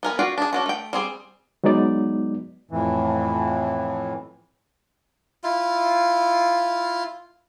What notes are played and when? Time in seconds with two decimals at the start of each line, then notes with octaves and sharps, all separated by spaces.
0.03 B3 A#4 G#5
0.19 F4 F#4 D5 F5 G5
0.38 D4 G#4
0.53 C#4 D4 F#4
0.66 A3 G5
0.93 G3 C4 G#4
1.64 F#3 G#3 B3 D#4 D5
2.71 F2 A2 E3
5.44 E4 F4